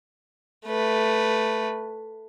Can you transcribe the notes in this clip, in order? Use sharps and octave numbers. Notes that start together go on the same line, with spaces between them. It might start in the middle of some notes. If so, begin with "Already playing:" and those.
A3 B4